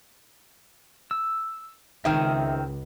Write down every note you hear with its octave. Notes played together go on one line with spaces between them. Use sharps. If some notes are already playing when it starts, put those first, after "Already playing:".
E6
C#2 D#3 G#3 C4 E5 D#6 F6